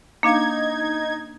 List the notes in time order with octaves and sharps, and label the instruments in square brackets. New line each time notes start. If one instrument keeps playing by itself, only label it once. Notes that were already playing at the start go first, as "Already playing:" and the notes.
[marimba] A#3 D4 F5 [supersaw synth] D#4 G#6